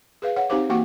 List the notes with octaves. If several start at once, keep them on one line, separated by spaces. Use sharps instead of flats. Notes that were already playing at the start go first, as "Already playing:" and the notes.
G#4 B4 F5
C#5 F#5
C4 D#4 G4 C5 F5 D6
E3 A#3 F#4 F#5 G5 D6